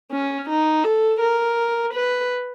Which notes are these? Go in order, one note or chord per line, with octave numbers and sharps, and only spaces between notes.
C#4
D#4
A4
A#4
B4